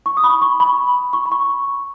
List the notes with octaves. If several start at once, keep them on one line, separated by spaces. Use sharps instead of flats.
C#6
D#6
B5
C#6
C#6
B5
C#6
B5
C#6